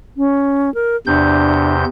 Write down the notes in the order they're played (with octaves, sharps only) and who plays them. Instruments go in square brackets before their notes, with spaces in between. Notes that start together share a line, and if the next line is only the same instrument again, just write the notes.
[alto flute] C#4
A#4
[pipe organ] E2 C3 G6 [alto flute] D4